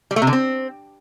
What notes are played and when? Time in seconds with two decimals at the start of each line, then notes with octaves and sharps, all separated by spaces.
0.11 G3
0.16 A3
0.22 C3
0.27 D3
0.33 C4